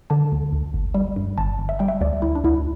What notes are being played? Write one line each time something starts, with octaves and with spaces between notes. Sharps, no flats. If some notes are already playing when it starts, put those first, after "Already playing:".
D3 A5
D2
D2
G1
G3
G2
G1 A5
G1
E5
G3 G5
E5
D2 D5
D2 E4
D4
D2 E4